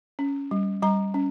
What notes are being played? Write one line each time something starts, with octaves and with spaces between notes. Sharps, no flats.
C#4
G3
G3 A#5
C#4